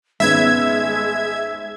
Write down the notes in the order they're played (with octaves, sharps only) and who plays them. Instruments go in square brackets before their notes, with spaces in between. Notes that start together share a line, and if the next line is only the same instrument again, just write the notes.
[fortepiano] G#1 B3 C#4 [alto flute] G#3 [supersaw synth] E5 G#6